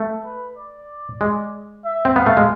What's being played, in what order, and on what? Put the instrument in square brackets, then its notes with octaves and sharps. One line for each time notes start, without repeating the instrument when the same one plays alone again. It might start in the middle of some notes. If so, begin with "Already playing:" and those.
Already playing: [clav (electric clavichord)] A3
[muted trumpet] B4
D5
[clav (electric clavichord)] G#3
[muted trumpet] E5
[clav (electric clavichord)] C4
[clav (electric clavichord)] B3 [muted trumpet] F5
[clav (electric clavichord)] A3
G#3